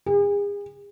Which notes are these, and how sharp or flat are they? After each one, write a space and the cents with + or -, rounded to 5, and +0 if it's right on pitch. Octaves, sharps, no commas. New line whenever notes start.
G#4 -40